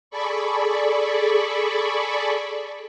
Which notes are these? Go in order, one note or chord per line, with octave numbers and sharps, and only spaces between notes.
G#4 A4 D5 B5 C#6